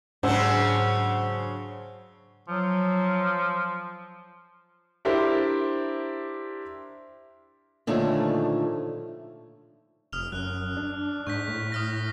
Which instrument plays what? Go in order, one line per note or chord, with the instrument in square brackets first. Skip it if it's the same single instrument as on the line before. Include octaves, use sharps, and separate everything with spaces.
[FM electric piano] G#2 [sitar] C#3 F#3 [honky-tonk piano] D4 C5 G#5 [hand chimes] F#5 E6
[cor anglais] F3 [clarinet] F#3
[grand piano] D4 E4 G4 A#4 C5
[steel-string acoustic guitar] A#2 D3 D#3 F3 A3 C#5
[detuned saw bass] F1 [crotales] D#6 F6 F7
[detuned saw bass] F#2 [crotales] F#6
[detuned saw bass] D4
[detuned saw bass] G#2 [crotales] C#6 G6 B6
[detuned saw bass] A2
[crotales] D#6 F6 A#6